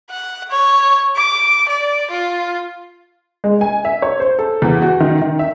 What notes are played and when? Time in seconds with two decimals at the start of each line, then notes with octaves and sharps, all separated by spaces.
0.11 F#5
0.50 C#5
1.16 D6
1.69 D5
2.10 F4
3.44 G#3
3.61 G#5
3.85 E5
4.02 C#5
4.20 C5
4.39 A4
4.62 E2
4.82 F#4
5.00 D#3
5.22 D#3
5.39 E5